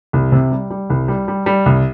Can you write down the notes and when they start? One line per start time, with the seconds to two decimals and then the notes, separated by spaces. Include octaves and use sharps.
0.13 C2
0.32 C3
0.51 G3
0.70 G3
0.90 C2
1.08 G3
1.28 G3
1.46 G3
1.66 C2